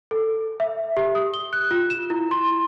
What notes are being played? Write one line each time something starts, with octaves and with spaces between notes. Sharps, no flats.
A4
E5
G4
D#6
G7
F#6
F4
E7
E4
C6